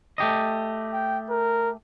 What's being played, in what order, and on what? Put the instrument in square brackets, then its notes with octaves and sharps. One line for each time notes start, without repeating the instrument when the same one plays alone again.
[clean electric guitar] A3 G4 D#5
[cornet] G5
A#4